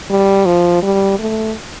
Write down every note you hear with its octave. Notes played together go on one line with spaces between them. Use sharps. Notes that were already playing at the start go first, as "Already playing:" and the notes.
G3
F3
G3
A3